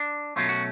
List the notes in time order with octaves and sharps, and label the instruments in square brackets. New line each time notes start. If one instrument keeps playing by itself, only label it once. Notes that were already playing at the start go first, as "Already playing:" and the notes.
Already playing: [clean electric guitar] D4
B2 F#3 A3 C#4 F4
F#4